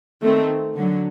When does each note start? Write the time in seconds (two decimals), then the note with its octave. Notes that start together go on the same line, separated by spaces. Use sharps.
0.22 D#3 A3 C4
0.76 D3 F#3